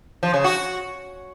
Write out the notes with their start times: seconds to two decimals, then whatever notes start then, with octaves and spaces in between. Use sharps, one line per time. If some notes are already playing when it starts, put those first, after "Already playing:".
0.23 F3
0.34 C#3
0.44 F#4